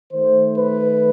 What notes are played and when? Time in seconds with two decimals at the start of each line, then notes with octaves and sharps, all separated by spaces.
0.13 D#3 A3 C5
0.57 B4